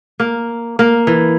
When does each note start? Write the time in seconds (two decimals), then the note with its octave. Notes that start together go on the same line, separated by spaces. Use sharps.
0.20 A#3
0.79 A#3
1.07 E3